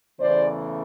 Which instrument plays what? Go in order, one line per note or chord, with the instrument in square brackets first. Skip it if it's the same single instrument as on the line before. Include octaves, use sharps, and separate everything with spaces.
[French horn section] E2 C#3 E3 A3 C5 D5